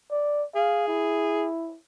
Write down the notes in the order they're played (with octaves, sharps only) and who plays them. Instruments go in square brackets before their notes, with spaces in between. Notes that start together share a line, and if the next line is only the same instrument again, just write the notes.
[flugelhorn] D5
[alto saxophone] G#4 [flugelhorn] F5
[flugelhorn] E4